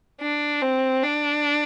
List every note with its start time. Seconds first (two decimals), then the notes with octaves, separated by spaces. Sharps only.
0.21 D4
0.62 C4
1.03 D4